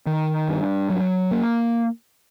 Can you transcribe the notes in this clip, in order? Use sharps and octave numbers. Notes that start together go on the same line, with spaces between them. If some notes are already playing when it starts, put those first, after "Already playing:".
D#3
G2
F#3
A#3